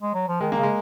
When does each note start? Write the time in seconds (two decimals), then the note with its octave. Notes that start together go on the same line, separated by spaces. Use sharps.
0.02 G#3
0.14 F#3
0.28 F3
0.41 D#3 G#3
0.52 D#3 A#3
0.58 C#3
0.63 G#3